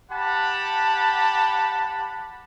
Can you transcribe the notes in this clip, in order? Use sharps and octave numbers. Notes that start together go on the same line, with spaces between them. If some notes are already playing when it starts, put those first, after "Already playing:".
G4 F#5 A5 B5